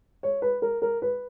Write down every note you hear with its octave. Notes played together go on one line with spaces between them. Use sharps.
C#5
B4
A#4
A#4
B4